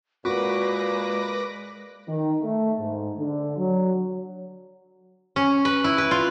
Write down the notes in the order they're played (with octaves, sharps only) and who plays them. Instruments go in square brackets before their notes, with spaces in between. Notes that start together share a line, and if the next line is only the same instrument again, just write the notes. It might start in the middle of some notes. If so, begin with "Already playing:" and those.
[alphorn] A#2 [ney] G#3 [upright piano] F#4 [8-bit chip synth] B4 D6 A#6
[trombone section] D#3
A3
G#2
D3
F#3
[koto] C#4
B4
E4
B4
F4